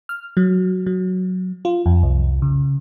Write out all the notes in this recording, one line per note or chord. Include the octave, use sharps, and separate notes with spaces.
F6
F#3
F#3
F4
F2
C2
C#3